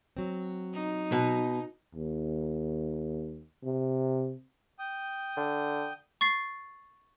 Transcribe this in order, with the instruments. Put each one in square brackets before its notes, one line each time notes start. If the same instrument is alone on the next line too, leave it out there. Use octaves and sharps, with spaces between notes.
[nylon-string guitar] F#3 C4
[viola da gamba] D#4
[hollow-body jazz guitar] B2
[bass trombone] D#2
C3
[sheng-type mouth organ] G5 D#6
[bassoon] D3
[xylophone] C#6 A6 C7